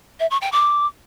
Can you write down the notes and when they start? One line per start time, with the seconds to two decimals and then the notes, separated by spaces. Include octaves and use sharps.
0.20 E5
0.31 C#6
0.41 G5
0.52 D6